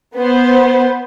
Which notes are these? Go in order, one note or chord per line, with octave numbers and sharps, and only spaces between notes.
B3 C5